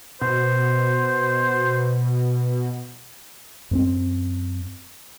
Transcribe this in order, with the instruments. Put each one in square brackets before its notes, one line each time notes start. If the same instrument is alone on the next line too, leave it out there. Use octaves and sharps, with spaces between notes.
[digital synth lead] B2 [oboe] C5
[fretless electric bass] F#2 B3 C4